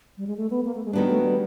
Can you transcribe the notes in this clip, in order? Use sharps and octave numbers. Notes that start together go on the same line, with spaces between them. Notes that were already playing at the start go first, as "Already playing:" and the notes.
G3
G#3
A3
B3
A#3
A3
G#3
D#3 F#3 G3 B3 D4
A3
G3